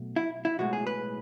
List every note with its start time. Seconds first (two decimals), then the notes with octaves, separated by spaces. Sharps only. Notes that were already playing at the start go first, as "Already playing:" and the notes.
Already playing: B1 B2 A3
0.16 E4
0.45 E4
0.59 B1 A2 G#3 F#4
0.73 G#4
0.87 B4